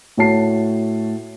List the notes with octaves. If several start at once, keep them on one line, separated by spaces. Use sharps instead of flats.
A2 F#4 C#5 A5 C7